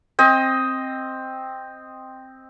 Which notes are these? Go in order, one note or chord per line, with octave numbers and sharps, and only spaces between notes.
C4 D#5